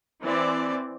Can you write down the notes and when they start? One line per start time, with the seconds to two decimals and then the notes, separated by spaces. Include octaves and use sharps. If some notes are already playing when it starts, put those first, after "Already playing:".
0.23 E3 C4 D5